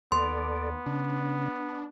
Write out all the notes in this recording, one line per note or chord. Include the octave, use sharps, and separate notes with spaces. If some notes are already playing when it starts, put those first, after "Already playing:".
D#2 B3 A4 D5 C6
C#3 D4